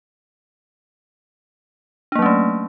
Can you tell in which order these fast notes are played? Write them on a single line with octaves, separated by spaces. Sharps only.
D4 A#3 F#3 C#4 A3